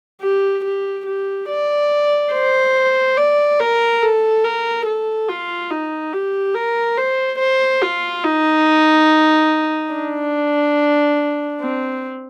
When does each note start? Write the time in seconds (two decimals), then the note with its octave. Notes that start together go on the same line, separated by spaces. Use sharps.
0.22 G4
0.65 G4
1.06 G4
1.49 D5
2.32 C5
3.17 D5
3.60 A#4
4.02 A4
4.45 A#4
4.86 A4
5.28 F4
5.70 D#4
6.13 G4
6.55 A#4
6.98 C5
7.39 C5
7.82 F4
8.24 D#4
9.93 D4
11.61 C4